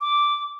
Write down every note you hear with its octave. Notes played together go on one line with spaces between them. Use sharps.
D6